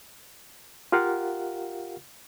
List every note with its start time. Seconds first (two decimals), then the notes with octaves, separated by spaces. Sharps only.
0.92 F4 G4 A#4 F5 F#5